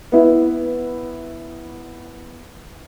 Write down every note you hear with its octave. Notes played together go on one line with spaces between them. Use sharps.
B3 E4